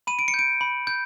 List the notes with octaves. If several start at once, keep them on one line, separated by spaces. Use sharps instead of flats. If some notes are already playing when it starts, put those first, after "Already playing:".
B5 D#7
D7
C#7
G6 D7
B5
G6